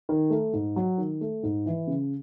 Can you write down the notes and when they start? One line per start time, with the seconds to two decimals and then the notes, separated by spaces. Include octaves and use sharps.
0.09 D#3
0.30 A3
0.53 G#2
0.76 F#3
0.98 D#3
1.21 A3
1.43 G#2
1.66 E3
1.87 C#3